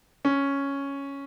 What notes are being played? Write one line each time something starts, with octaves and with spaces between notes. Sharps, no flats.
C#4